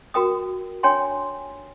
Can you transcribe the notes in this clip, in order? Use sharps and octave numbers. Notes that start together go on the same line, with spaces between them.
F#4 A#4 G5 D#6
D4 C#5 G5 G#5 C6